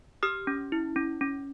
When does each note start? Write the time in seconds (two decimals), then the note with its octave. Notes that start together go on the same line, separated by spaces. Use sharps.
0.23 G4 D#6 F6
0.47 C#4
0.72 E4
0.96 C#4
1.21 C#4